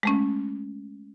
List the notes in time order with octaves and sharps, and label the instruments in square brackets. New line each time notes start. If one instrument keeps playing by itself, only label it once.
[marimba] G#3 A3 C#4